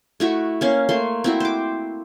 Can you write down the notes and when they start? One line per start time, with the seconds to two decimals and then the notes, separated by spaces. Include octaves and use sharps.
0.20 A3 E4 F#4
0.61 A#3 C#4 F5
0.89 A3 A#3 C6
1.24 C4 E4 F#4
1.40 C5 D6